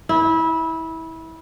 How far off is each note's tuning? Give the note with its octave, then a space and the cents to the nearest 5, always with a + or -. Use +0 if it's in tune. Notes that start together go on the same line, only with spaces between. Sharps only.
E4 -25